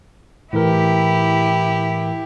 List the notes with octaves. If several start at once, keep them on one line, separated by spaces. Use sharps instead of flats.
A2 E3 E4 G4 A#4